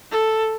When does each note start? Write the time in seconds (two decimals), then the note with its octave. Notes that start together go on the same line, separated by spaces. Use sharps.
0.11 A4